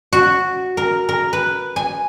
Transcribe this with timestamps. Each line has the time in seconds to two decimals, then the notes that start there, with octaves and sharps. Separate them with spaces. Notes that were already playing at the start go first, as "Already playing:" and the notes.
0.13 F#4
0.77 A#4
1.09 A#4
1.33 B4
1.76 G#5